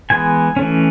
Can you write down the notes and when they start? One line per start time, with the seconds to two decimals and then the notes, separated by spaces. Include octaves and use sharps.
0.10 E3 G#3 B3 G#5
0.56 E3 A3 C#4